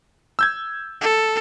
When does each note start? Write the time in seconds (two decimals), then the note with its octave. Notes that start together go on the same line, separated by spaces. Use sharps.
0.39 E6 G6 G#6
1.01 A4